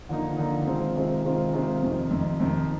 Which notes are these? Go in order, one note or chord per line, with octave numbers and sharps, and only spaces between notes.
D3 F3 A#3 D#4
D3 F3 A#3 D#4
C3 D#3 G#3 C4 F4
C3 D#3 G#3 C4 F4
C3 D#3 G#3 C4 F4
C3 D#3 G#3 C4 F4
F2 C3 D#3
F2 C3 D#3
F2 C3 D#3